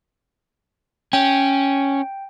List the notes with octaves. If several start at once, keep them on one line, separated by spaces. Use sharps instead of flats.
C#4 G5